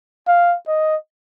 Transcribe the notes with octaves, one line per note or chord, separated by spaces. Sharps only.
F5
D#5